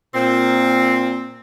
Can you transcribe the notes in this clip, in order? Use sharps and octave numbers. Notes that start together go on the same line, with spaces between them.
A#2 C4